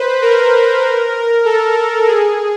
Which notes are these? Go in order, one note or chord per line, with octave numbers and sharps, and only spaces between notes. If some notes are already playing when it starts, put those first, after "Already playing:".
Already playing: B4 C5
A#4
A4
G#4